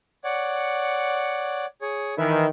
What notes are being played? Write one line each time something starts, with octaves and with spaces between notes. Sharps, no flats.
C#5 D5 F#5
G#4 C#5
D#3 E3 E4 B4 E5